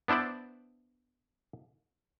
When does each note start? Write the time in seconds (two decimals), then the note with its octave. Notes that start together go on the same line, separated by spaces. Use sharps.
0.08 B3 D4 E4 C5 D5